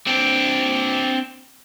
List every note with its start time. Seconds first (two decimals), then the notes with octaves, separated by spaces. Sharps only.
0.07 C4 D4